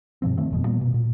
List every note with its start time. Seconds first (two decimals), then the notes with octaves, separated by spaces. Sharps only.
0.22 G2 B2 F3 C4
0.38 D#3 A3 C4
0.50 G1 F2 B2
0.66 A#2 G3 A#3 B3
0.81 B2
0.94 A#2